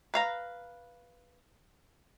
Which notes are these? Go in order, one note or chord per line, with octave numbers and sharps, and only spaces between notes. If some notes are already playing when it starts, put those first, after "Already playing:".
B4 F5 A#5